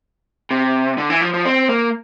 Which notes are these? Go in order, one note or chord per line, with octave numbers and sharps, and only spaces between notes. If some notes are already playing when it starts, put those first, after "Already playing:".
C3
D3
E3
F3
F3
C4
A#3